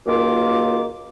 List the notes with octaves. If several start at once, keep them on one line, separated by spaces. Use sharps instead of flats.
C#2 F#2 D#3 A#3 F4 D6